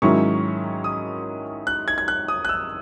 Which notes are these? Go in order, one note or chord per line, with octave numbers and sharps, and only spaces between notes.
G#2 D#3 F#3 C#4 E4 C#6
D#6
F#6
G#6
G#6
F#6
D#6
F#6
E6